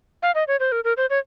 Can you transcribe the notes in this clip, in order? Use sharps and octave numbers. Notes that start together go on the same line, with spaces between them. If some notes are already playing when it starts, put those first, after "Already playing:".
F5
D#5
C#5
C5
A#4
A#4
C5
C#5